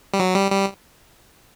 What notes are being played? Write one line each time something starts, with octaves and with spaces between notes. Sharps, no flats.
G3
F#3
G3
G3